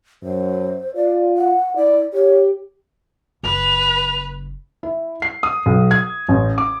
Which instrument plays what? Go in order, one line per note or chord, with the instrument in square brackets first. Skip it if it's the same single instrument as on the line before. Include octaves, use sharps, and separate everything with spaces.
[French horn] F#2 [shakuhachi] C5
[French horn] F4 [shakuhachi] D5
[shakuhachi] F#5
[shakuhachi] E4 [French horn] D5
[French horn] G4 [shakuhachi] C#5
[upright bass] F#1 [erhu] B4 [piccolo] F7
[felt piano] E4
C7
D#6
B1
G#6
A1
D6